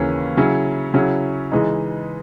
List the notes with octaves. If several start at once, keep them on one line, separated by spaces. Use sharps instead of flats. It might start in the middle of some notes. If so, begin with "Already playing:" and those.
Already playing: D#2 C#3 E3 A#3 C#4
C#3 F#3 C#4 E4
C#3 F#3 C#4 E4
C#3 E3 G#3 D#4